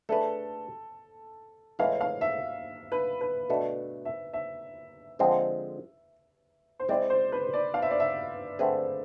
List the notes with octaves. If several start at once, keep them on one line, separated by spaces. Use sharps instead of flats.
A3 D4 G#4 A4 B4
A2 E3 G#3 F5
F5
E5
B4
B4
B2 A3 D4 A4
E5
E5
D3 F3 G#3 C4
C5
G#3 C4 E4 D5
C5
B4
D5
F5
E5
D5
E5
D3 A3 C4 G#4 B4